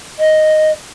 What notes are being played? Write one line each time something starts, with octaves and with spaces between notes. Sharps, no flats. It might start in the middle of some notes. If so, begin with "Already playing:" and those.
D#5